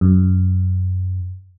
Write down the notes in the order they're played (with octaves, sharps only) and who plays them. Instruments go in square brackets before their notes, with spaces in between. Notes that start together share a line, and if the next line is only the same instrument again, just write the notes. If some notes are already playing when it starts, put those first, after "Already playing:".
[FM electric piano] F#2